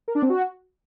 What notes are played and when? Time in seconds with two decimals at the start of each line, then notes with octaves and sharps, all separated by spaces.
0.08 A#4
0.15 D4
0.22 C4
0.30 F#4